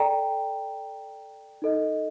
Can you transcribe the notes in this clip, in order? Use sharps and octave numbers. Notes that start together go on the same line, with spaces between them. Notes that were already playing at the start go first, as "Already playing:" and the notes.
Already playing: A4 D5 G5 A#5
D#4 A4 D#5